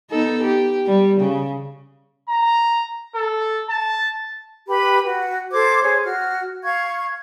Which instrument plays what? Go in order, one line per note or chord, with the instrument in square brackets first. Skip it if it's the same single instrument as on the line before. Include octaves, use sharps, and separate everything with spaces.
[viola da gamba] B3 D#4 A4
G4
G3
C#3
[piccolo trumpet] A#5
A4
A5
[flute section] G4 B4 B5
F#4
A4 C5 D6 G#6
G#4 C5 C#5
F#4 F6
F5 C#6 G#6